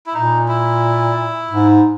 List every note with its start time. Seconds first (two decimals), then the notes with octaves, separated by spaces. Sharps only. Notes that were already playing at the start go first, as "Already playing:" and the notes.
0.06 E4
0.14 A#2 D#4
0.48 E4
1.51 G#2